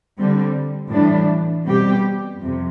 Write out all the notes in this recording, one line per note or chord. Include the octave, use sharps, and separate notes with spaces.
D3 G3 C4
A2 E3 G3 D4
B2 G3 C4 G4
F2 C3